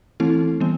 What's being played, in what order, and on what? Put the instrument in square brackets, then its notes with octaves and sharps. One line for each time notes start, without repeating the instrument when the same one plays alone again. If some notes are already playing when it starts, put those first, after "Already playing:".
[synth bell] E3 A3 C4 E4 A4
E3 G3 B3